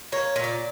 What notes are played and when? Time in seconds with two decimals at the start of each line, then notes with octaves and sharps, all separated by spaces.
0.12 A#3 C#5
0.36 A#2
0.44 D5